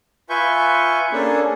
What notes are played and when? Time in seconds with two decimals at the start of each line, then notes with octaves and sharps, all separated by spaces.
0.30 F4 B4 E5 G#5 C#6 G6
1.13 A#3 C#4 D4 G#4 A4